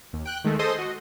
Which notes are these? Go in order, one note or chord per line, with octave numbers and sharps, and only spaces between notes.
D#2
G5 F#6
D#3 G#3 A3
G#4 A4 C5 D#5 C6 D#6
F#4 D#5